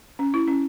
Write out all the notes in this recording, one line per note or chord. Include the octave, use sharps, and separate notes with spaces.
C#4
E4
C#4